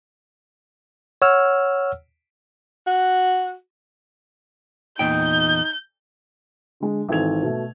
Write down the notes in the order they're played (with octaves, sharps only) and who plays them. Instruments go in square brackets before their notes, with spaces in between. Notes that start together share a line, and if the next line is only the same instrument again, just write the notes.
[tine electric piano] C#5 F#5 E6 F6
[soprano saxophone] F#4
[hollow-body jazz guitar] E2 A#2 G5 [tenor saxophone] D#4 [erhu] G6
[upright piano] D3 G#3
G#1 G#2 E3 A4 G#6 F7
B2 A3